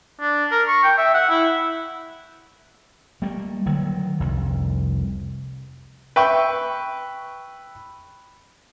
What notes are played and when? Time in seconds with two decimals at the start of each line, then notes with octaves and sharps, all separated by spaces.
0.21 D4
0.51 A#4
0.68 C#6
0.84 G5
0.98 E5
1.14 F#5
1.29 E4
3.22 G3 A3 A#3
3.66 D3 D#3 F#3
4.20 F1 C2
6.16 B4 E5 G5 C#6